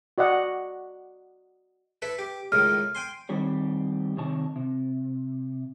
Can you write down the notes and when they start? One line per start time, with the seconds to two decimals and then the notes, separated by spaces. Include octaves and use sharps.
0.18 F#4 D5 D#5 F#5
2.02 E4 A4 B4
2.19 G4
2.52 C#2 A2 D#3 F6
2.95 G5 G#5 C6
3.29 D#3 G3 C4 G4 C#5
4.17 C3 D#3 C#5 A5
4.56 C3